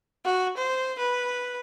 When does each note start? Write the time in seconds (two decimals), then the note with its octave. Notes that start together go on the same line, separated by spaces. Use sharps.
0.25 F#4
0.57 C5
0.99 B4